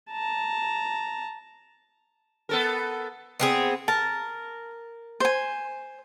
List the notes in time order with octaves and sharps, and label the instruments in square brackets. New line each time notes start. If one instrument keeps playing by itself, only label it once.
[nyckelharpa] A5 A#5
[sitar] B3 A4 A#4
[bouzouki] B3 C4 G#4
[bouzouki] A#4 [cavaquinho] A5
[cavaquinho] C5 G#5